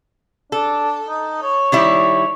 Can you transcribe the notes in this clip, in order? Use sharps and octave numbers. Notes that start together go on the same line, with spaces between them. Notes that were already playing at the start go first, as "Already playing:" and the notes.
D4 A4
D#4
C#5
D#3 G3 E4